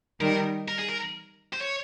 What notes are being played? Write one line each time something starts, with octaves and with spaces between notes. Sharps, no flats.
D#3 G3 A#4
A#4
G#4
A#4
C5
C#5